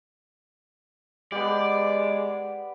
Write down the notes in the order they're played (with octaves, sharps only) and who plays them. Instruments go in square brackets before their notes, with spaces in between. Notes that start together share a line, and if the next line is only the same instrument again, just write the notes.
[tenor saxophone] G#3 [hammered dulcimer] B3 G4 [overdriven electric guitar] D5